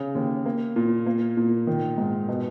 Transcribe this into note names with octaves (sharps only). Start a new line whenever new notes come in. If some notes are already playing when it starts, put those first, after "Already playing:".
Already playing: C#3
D#2
A#3
A#2
A#3
A#2
D#3
G#2
B2